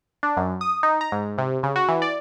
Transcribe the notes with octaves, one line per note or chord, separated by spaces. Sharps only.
D4
F#2
D#6
D#4
A#5
G#2
C3
C#3
F#4
E3
D5